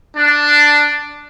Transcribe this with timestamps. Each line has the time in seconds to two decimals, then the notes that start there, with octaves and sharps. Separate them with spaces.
0.16 D4